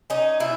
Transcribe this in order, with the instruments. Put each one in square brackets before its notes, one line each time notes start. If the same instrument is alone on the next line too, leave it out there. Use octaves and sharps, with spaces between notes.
[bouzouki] C#4 D#4
B2 E4